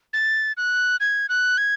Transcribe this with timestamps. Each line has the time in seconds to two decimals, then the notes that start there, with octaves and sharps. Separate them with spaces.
0.13 A6
0.57 F#6
1.00 G#6
1.29 F#6
1.58 G#6